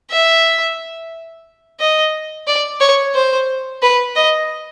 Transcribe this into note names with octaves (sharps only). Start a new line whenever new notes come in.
E5
D#5
D5
C#5
C5
B4
D#5